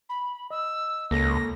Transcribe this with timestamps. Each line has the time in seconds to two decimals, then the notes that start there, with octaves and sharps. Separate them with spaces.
0.09 B5
0.51 D#5 E6
1.11 C#2 A#3 A4 A#6